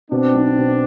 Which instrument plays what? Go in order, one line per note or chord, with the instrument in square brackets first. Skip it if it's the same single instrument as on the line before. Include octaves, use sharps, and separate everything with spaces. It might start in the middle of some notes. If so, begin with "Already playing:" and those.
[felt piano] B2 [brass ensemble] C4 D4
[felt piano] B1
B2